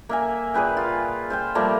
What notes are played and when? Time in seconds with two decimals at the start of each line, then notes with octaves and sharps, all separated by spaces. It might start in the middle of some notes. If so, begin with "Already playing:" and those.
0.09 A#3 E5 G#5
0.54 A#2 G#4 B4 G5
0.77 F4
1.30 C5 F5 G5
1.55 F3 G3 A3 A#3